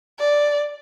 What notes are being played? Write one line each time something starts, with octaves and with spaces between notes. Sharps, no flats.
D5